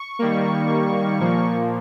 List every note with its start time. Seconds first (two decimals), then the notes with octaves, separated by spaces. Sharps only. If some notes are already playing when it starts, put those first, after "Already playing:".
Already playing: C#6
0.19 D#3 G3 A#3
1.20 A#2 F3 A#3